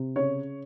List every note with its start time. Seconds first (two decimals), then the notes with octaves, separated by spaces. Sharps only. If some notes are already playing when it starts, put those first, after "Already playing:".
Already playing: C3
0.16 C#3 C#5